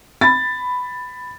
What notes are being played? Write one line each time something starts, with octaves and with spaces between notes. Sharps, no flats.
B5 A6